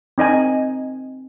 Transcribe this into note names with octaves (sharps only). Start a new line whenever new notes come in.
C4 D#4 D#5 G#5